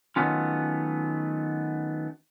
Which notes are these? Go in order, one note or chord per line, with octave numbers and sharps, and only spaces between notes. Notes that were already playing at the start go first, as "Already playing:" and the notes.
D#3 F#3 A3 B3 C#4 F4